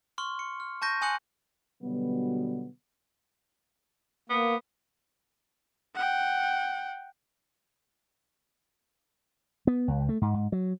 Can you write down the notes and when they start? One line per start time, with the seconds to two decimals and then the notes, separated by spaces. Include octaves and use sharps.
0.18 C6 C#6 F6
0.39 C#7
0.60 F6
0.82 A5 C#6 G6 A#6 D#7
1.02 G#5 C6 D#6 F#6 C#7 F#7
1.82 B2 D3 F#3 G3 B3
4.29 A#3 B3
5.95 F#5 G5
9.67 B3
9.88 C#2
10.09 A3
10.22 G#2
10.34 G#2
10.52 F#3